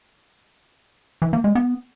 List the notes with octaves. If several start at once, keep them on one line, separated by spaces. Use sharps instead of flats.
E3
A#3
G#3
B3